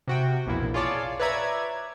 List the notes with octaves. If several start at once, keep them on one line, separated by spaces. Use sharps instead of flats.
C3 F#4 G5
A#1 E2 A#2 E4
F4 G#4 C#5 D5 A5
B4 C#5 D5 E5 A#5 G#6